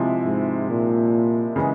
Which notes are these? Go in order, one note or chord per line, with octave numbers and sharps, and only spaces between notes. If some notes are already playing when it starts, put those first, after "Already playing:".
Already playing: C3 F3 G#3 E4
G#2
A#2
C#3 E3 G#3